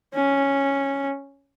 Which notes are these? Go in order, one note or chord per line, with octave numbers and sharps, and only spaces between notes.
C#4